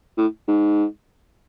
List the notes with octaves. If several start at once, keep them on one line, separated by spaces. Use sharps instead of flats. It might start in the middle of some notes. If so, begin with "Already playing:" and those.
A2
G#2